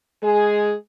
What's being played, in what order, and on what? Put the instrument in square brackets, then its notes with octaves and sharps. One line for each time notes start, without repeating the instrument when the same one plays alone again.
[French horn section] G#3 G#4